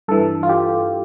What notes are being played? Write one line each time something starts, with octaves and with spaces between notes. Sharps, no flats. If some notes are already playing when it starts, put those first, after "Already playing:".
G2 E3 A4
F4
G4